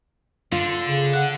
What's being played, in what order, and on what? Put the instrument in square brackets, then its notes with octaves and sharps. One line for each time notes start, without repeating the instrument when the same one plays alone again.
[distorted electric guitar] D3 [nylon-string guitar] F4
[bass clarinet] C#3
[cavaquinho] F#5